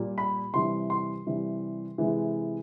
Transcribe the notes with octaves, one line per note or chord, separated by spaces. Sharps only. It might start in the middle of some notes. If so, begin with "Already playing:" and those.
Already playing: A#2 G3
B5
C3 E3 G3 C6
C6
C3 E3 G3
C3 E3 G#3